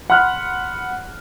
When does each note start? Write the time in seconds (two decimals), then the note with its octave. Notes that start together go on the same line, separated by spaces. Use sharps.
0.10 F#5 B5 C6 F6 F#6